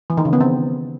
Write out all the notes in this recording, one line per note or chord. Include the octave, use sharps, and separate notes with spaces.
E3
D#3
C#3
B3
C4